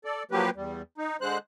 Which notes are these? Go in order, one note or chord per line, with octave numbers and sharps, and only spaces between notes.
A4 D5
F3 F#3 A#3 G4 B4
E2 G3
D#4
D3 G#3 C5 F#6